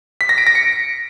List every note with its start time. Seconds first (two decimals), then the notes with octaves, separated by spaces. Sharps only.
0.21 B6
0.29 A#6
0.38 D7
0.47 A#6
0.55 C#7